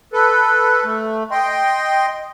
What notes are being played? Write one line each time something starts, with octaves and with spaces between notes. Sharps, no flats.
A4 B4
A3
D#5 G5 C6